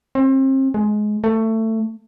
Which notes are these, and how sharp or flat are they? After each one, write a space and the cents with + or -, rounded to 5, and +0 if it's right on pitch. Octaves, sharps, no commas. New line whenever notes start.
C4 +35
G#3 +20
A3 +20